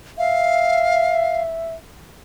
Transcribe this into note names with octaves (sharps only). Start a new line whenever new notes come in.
E5 F5